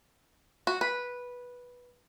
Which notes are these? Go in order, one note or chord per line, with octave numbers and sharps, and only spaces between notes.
F#4
B4